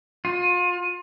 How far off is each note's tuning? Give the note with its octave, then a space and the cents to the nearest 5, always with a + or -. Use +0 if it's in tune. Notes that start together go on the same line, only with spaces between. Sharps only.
F4 +35